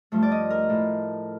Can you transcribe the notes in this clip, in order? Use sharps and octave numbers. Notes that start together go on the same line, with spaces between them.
G2 F3 A3
D5
D#5
A#4
A2 A3